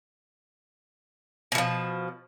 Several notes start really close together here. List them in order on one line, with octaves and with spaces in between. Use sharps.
B2 E3 F3